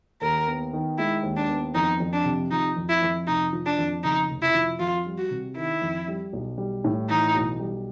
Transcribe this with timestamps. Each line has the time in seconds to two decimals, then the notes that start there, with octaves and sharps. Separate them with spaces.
0.21 D#2 A#4
0.48 B3
0.73 D#3
0.98 G#3 E4
1.23 D#2
1.37 D4
1.50 B3
1.75 F2 D#4
2.00 F2
2.13 D4
2.25 C3
2.51 F3 D#4
2.77 F2
2.89 E4
3.03 F2
3.27 F1 D#4
3.53 F3
3.66 D4
3.79 F2
4.04 C#3 D#4
4.30 F1
4.42 E4
4.54 F3
4.80 F2 F4
5.06 G3
5.18 F#4
5.31 C3
5.57 D#3 E4
5.82 F2
6.08 G3
6.33 B1
6.58 G3
6.84 A2
7.09 E3 D#4
7.35 B1
7.60 G3